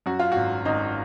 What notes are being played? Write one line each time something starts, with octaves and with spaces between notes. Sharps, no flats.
F#2 F#4
F4
G#1 F#4
G#1 D#4